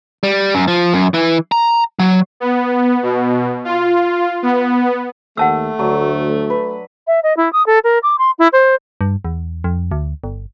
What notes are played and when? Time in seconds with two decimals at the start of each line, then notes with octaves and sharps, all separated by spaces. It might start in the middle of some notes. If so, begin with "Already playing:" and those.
0.23 G3
0.55 F#2
0.68 F3
0.93 F#2
1.14 E3
1.52 A#5
1.99 F#3
2.40 B3
3.03 B2
3.65 F4
4.43 B3
5.37 D#2 A3 F#5 A5 E6
5.79 D2 F#3 D4
6.50 B4
7.07 E5
7.23 D#5
7.37 E4
7.53 D#6
7.66 A4
7.84 A#4
8.03 D6
8.18 C6
8.39 E4
8.53 C5
9.01 G2
9.25 E2
9.64 F2
9.91 D2
10.24 G1